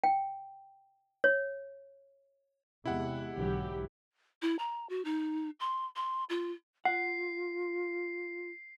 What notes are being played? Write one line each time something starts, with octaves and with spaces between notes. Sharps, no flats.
G5
C#5
E2 C3 G#3 E4 G4 F#5
B1 G#2 D3 E3 F#3 G4
E4
A#5
F#4
D#4
C6
C6
F4
F4 F#5 C7